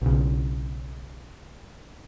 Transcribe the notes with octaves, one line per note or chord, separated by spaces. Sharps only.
B1 C#3